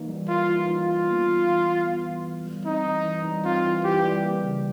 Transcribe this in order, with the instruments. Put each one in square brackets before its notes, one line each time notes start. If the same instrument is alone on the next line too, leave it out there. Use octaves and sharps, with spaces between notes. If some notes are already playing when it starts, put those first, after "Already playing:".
Already playing: [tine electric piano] E3 A#3 D#4
G3
[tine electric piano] A#3 [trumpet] F4
[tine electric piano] E3
[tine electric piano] D#4 [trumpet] F4
[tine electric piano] G3
B3
E3
E3
G3
B3
E3
E3
G3
[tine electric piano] C4 [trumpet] D#4
[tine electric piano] E3
E3
G3
[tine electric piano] C4 [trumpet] F4
[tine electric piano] E3
[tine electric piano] E3 [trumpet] G4
[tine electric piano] G3
A#3
C#3